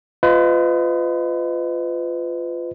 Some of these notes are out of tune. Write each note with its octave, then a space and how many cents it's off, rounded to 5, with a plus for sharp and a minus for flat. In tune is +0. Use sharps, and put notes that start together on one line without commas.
F4 -5 B4 +35 D#5 +0